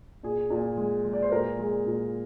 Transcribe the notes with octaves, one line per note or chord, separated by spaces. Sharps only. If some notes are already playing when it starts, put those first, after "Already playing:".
A#2 G#4
A#2
G#3
G#3
D5
C5
A#2 A#4
G#3
A#2